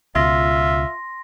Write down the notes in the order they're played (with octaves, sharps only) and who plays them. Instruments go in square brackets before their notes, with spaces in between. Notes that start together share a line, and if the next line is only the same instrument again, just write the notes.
[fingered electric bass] C#2 B2 [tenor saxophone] F4 [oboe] E5 [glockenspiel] C6 A#6